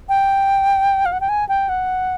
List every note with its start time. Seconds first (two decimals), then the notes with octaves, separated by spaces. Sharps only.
0.09 G5
1.06 F5
1.13 F#5
1.21 G5
1.29 G#5
1.49 G5
1.69 F#5